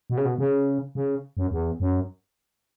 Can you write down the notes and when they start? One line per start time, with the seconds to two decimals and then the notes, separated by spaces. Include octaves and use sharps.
0.10 B2
0.17 C#3
0.25 B2
0.38 C#3
0.95 C#3
1.37 F#2
1.51 E2
1.80 F#2